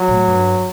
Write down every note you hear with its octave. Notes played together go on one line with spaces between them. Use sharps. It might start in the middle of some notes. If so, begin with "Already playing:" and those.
Already playing: F#3
A2
G2